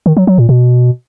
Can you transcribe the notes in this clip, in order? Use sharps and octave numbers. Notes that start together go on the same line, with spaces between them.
D#3
F#3
F#3
A#2
B2